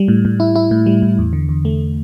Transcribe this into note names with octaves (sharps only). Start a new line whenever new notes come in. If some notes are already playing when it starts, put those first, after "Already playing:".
Already playing: G3
A2
A2
E4
E4
A2
G3
A2
E2
D3
E2
A3